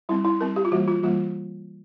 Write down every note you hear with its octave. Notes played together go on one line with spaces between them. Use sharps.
G3 C4 E4
E4
G3 C4 A#4
G4
F4
E3 G3 A#3 F#4
F4
E3 G3 A#3 F4